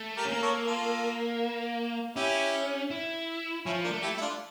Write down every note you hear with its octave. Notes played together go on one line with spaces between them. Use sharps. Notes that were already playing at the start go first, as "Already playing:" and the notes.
Already playing: A3
G4 A#4
C#4
A#3 A#4
A4 C#5
F4 A4
C#4 E4 G4
E4
F3 C#4 E4
A#3 D4
A3
E4 G4
E4
D4 F4